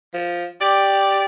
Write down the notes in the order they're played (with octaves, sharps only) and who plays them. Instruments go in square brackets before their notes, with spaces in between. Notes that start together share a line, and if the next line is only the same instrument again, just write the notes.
[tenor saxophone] F3
[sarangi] G4 [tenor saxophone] D5